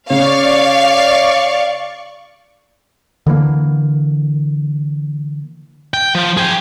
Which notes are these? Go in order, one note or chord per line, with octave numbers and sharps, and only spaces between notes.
C#3 C#5 D5 F5 C#6
D3 E3 G3 A#3
G5
F3
G#4 G5